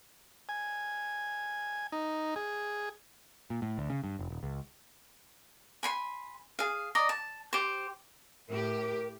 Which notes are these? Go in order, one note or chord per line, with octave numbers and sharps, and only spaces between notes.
G#5
D#4
G#4
A#2
A2
D2
C#3
G2
F1
D#1
C#2
G#5 B5 C6
G#4 F5
D5 D#5 A#5
A5
G4 C5
A2 G4 A#4